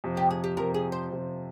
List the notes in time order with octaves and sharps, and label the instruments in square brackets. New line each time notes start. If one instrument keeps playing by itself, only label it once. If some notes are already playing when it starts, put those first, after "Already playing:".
[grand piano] F2 C3 F3
[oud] G4
G#4
G4
[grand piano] F2 C3 F3 [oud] A#4
[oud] G#4
C5
[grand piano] F2 C3 F3